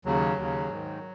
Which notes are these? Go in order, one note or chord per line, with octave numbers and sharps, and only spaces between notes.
D#2 C#3 F#3
D#2 C#3
G#2 D#3